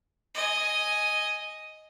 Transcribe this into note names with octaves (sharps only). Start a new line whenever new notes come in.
D#5 G#5